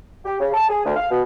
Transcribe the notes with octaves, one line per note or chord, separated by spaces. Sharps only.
G4
C#3
A5
G#4
D2
F5
B2